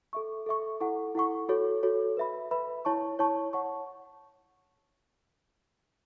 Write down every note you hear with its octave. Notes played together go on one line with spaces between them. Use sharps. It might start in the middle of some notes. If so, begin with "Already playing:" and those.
A4 E5 C#6
A4 E5 C#6
E4 A4 F#5 C#6
E4 A4 F#5 C#6
F#4 A4 C#5
F#4 A4 C#5
B4 E5 B5
B4 E5 B5
E4 C#5 A5 C#6
E4 C#5 A5 C#6
C#5 F#5 A5 C#6